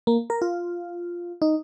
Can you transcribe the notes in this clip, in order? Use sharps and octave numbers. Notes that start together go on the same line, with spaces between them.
A#3
A#4
F4
D#4